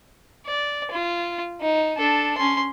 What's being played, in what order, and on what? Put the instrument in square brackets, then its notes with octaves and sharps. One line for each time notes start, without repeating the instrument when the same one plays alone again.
[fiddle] D5
F4
D#4
D4 A4
C#4 C6